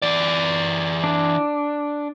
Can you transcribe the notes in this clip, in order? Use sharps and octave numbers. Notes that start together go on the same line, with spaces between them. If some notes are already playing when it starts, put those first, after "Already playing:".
E3 D5
D4